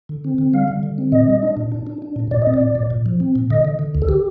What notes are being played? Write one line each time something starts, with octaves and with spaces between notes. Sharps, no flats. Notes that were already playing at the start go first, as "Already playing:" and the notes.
D3
C4
D3
G3 F5
G3
D3
C4
A#2 D#5
G3
D4
A#2
D4
D4
D4
A#2
A#2 D5
C4 D#5
D5
A#2
A#2
A#2
F3
C4
A#2
D3 D#5
D3
D3
D2
A4
G4